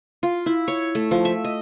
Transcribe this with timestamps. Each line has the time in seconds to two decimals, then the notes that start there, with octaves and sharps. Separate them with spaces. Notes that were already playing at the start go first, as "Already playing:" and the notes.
0.23 F4
0.46 E4
0.68 C#5
0.95 A3
1.11 F3
1.25 E5
1.44 D#5